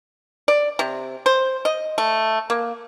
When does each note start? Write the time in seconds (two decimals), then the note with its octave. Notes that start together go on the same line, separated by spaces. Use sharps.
0.48 D5
0.79 C3
1.26 C5
1.65 D#5
1.98 A3
2.50 A#3